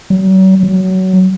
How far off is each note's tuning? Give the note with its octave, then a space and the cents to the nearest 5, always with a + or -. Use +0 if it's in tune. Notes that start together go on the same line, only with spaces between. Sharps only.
F#3 +40
F#3 +20